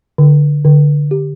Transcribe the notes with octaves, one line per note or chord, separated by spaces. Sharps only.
D3
D3
G4